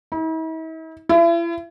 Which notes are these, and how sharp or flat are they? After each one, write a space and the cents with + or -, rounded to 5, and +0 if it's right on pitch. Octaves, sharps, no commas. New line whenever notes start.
E4 -45
E4 +40